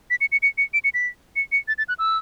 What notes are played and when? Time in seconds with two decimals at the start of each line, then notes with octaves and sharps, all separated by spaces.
0.10 B6
0.21 C#7
0.32 C#7
0.42 C#7
0.58 C#7
0.74 D7
0.84 C#7
0.94 B6
1.36 C#7
1.52 C#7
1.68 A6
1.78 A6
1.89 F#6
1.99 E6